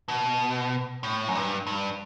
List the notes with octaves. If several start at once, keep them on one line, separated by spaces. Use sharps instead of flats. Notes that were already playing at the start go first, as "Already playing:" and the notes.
B2
A2
F#2
G2
G2